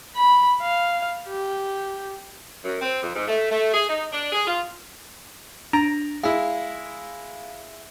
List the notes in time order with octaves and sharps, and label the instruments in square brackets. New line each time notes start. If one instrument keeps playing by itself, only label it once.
[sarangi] B5
F5
G4
[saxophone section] F#2
C4
F2
G#2
A3
A3
G#4
D#4
D4
G#4
F4
[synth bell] D4 [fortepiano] A#5
[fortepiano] G#3 E4 [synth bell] F5